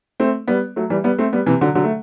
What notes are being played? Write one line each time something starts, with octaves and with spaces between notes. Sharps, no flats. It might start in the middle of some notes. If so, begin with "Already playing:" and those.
A3 C4
G3 B3
F#3 A3
E3 G3
G3 B3
A3 C4
G3 B3
C3 E3
D3 F#3
D3 F#3
A3